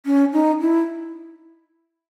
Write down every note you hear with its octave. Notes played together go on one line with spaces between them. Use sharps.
C#4
D#4
E4